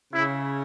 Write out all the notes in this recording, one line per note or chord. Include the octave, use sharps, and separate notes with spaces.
C#3 E4